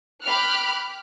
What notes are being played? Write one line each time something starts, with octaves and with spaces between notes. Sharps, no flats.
G5 B5 D6 F6 F#6